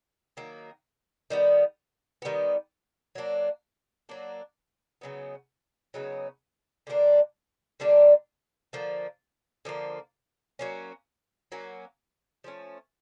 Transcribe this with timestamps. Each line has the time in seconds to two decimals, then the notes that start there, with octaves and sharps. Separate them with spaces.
0.37 D#3 F#3 A#3
1.30 D#3 G3 B3
2.22 D#3 G3 B3
3.15 F#3 A#3 D4
4.09 F#3 A#3 D4
5.01 C#3 F#3 B3 D#4
5.94 C#3 F#3 B3 D#4
6.87 D3 G3 A#3 D4
7.80 D3 G3 A#3 D4
8.73 D3 F3 A#3
9.65 D3 F3 A#3
10.59 F#3 A#3 C#4
11.52 F#3 A#3 C#4
12.44 F3 A3 C#4